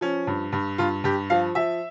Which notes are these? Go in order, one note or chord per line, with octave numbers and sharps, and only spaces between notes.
F3 C#4
G2
G2
G2 F4
G2 G4
F3 F5
F3 E5